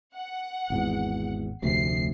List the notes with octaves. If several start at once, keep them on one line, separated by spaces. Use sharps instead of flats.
F#5
G#1 E2
F1 D2 C3 C7